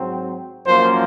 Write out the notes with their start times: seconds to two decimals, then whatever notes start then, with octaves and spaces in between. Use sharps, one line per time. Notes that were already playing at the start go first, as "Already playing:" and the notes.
Already playing: G#2 F#3 C4
0.67 F#2 F3 A#3 C5